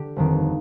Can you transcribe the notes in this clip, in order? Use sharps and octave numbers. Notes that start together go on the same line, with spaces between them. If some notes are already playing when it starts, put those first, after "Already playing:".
Already playing: D3 G4
G1 F2 D#3